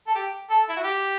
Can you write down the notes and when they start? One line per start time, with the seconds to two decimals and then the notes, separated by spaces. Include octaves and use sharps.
0.08 A4
0.15 G4
0.50 A4
0.69 E4
0.77 F#4
0.84 G4